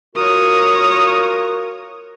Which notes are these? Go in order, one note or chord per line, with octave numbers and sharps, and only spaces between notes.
F4 F#4 A#4 C#5 D#6